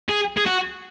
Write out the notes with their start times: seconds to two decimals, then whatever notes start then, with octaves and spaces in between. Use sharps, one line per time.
0.09 G#4
0.37 G#4
0.46 F#4